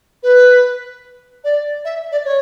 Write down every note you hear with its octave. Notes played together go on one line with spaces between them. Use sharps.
B4
D5
E5
D5
C#5